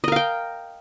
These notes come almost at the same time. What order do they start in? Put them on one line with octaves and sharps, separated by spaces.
D#5 A#4 F5 G5